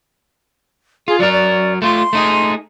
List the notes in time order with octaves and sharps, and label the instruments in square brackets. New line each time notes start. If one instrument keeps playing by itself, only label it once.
[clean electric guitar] F4 [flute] G#4
[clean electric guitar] F#3 A#4 [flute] D5
[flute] D5
[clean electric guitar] A3 F4 [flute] C6
[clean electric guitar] A3 D#4 G#4